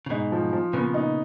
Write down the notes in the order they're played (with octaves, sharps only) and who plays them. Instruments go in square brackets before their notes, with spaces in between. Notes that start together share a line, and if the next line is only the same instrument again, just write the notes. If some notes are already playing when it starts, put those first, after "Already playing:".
[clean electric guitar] C#3
[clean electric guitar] G#2 B2 [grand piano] D#4
[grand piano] F3
F3
[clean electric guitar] A#2 C#3 [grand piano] B3
[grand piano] D#4